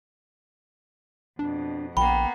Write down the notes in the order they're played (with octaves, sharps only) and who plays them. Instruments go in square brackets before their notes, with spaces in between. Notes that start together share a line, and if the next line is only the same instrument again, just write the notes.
[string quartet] F2 B2 [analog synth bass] D4
[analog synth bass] A#1 [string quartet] A#3 B3 F#5 [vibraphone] G5 [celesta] B5